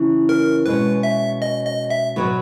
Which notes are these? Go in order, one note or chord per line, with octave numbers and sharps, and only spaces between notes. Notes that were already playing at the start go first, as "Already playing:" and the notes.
Already playing: C#3 E3 C#4
A#4
B2 G#3 C#4 B4
E5
D#5
D#5
E5
B2 F#3 B3 F#4